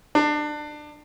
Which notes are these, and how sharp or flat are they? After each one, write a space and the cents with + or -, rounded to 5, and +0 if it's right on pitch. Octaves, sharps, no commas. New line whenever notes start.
D4 +25